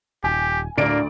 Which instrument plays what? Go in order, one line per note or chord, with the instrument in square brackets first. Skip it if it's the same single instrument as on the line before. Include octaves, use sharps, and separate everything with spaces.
[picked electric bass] D#1 [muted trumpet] G4 [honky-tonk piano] G#5
[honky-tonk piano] D2 D5 D7 [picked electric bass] A2 D4 [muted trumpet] A#3